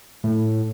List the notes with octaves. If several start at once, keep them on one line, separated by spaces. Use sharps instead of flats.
A2